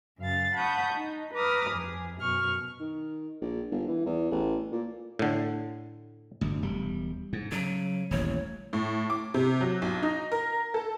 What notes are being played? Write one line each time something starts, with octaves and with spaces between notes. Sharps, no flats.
F#2 C#3 F5 A6
F#5 A5 B5 C#6 D#6 G6
D#4
B4 A#5 D6 D#6 F6
F2 G#4
F#2 B2 C#6 F6
D#3
A#1
G1
E3
E2
A1
A#2
A2 D3
G1 D2
E1 G3
G#2
C#3 F#3
D#1 A1 C#5
A2
D6
C3
F#3
B1
D#4
A#4
A4